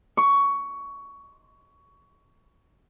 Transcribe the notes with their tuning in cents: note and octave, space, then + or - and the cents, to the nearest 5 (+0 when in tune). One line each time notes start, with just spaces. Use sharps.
C#6 +15